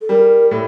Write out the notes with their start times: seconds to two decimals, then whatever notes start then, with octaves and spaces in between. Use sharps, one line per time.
0.01 A4
0.09 G3 A#4
0.50 A2 A4